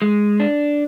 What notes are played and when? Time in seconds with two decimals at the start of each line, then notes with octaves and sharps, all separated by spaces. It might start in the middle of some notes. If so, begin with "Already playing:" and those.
0.02 G#3
0.40 D4